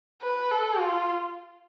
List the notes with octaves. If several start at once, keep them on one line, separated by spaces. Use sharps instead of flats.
B4
A4
F4